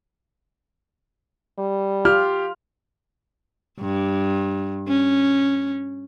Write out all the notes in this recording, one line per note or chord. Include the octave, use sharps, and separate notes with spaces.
G3
F4 G4 F6
G2
C#4